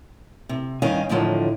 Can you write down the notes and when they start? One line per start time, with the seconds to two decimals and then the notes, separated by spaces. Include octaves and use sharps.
0.49 C3
0.82 G2 D#3 C#4 D#5 F5 G#5
1.09 A2 D3 D#3 F3 F#3